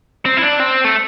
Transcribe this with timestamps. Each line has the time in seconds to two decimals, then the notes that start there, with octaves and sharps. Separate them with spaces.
0.26 C4
0.37 E4
0.42 D4
0.60 C4
0.84 A3